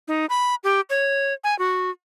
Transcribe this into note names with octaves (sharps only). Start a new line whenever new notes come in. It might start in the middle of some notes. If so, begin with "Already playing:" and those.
D#4
B5
G4
C#5
G#5
F#4